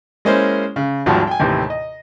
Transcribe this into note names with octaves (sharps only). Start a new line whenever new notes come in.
G#3 A#3 C#4 E4 C5
C#3
G#1 D#2 F3 G3 F#4 A5
G5 G#5
D#2 A2 C3 E3
D#5